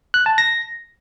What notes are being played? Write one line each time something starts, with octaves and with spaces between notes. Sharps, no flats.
F#6
A5
A#6